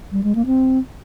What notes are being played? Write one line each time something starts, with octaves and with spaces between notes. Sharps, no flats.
G3
G#3
A#3
C4